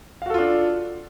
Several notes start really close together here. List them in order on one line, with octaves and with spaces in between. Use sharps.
F5 F#4 A4 F4 D4